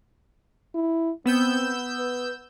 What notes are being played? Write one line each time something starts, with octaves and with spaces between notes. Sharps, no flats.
E4
B3 C4 E6 G6
B4